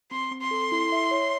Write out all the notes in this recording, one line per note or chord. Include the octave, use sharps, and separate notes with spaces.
C4 C6
C4
C6
A4
E4
E5
C#5